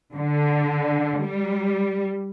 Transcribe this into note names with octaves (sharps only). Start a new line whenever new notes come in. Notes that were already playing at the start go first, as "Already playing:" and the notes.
D3
G3